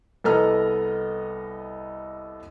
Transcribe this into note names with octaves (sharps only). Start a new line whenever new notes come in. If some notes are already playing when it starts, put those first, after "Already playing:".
C2 B3 A4 D#5 A#5 F6